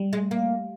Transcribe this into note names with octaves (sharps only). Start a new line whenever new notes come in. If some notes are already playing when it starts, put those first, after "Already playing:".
Already playing: G3
G#3
A#3